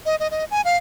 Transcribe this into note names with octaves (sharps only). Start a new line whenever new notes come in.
D#5
D#5
D#5
G#5
F5